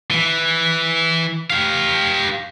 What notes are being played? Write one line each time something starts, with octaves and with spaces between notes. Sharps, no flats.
E3
G4 F5